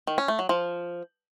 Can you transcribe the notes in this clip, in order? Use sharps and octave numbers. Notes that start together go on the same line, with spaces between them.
D#3
C#4
A3
F#3
F3